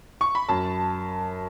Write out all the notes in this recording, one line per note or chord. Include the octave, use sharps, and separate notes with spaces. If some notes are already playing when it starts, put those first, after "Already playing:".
C#6
B5
F#2 A5